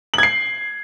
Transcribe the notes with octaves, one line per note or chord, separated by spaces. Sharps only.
G#6 C7 F#7